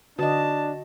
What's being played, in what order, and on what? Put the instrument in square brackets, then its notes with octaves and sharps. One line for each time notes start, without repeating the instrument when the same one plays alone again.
[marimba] D3 [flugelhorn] D4 [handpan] F#4 D#5 [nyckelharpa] A5